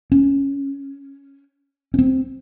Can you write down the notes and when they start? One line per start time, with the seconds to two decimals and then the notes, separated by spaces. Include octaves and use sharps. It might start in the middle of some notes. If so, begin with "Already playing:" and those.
0.12 C#4
1.94 C#4
1.99 C4